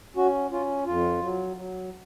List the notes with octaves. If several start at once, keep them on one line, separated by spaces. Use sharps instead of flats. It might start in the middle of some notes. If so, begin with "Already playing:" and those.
C#4 F#4
C#4 F4
F2 F4
F#3
F#3